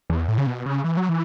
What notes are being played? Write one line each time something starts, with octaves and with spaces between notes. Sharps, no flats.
E2
A2
C#3
B2
C#3
E3
F#3
E3